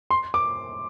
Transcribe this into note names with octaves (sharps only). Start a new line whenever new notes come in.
C6
D6